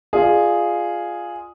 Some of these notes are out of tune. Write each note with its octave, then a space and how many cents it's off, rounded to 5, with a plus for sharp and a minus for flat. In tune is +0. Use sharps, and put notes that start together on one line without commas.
F4 +0 G#4 +0 D5 +40